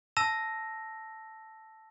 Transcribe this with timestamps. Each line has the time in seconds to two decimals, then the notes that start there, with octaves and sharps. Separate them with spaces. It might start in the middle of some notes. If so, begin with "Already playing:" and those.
0.17 A5 E6 A#6 E7